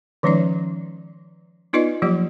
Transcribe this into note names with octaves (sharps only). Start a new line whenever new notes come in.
D#3 F3 G#3 C#4 D#4 D5
B3 D#4 F4 B4 D5 D#5
F3 F#3 A#3 F4 G4